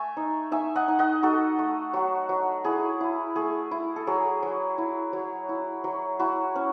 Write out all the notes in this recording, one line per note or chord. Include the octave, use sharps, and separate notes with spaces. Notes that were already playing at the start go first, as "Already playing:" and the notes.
Already playing: A3 E5 G#5
D#4
D#4 E5 G#5
D#5 F#5
D#4
D#5 F#5
D#4 F#4 A4
A3
F#3 F#4
F#3
E4 G#4
E4
A3 G#4
E4
A4
F#3 G#4
F#3
E4
F#3
E4
F#3
E4 F#4
C#4